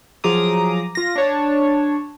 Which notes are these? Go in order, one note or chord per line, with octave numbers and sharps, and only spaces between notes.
F3 F#3 G#4 A#5 D6 D#6
F4 A#6
D4 C#5 A5